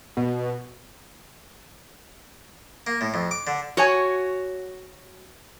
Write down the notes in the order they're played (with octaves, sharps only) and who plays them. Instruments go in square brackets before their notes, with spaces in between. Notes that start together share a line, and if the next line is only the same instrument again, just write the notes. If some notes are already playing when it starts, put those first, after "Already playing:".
[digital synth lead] B2
[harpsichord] A#3
A2
F2
D6
D3
[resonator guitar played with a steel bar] F#4 C#5 G#5